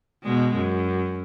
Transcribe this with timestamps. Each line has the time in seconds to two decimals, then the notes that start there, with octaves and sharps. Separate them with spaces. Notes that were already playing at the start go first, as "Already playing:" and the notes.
0.24 B2 G#3
0.54 F#2